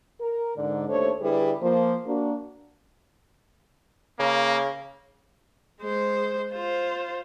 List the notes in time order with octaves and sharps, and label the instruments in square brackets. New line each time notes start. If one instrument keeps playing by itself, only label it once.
[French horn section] A#4
G#2 D3 D5
D#2 A3 D4 A4 C5 C#5
D3 G3 E4 G#4 B4
F3 A#3 C5
A#3 D4 F#4
[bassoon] C#3 [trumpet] A#3
[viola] G#3 C5
F4 C5